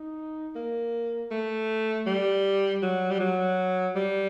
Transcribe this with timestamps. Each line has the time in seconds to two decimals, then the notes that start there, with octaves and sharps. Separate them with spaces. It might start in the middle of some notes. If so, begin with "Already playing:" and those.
Already playing: D#4
0.55 A#3
1.31 A3
2.06 G3
2.82 F#3
3.11 G3
3.20 F#3
3.95 G3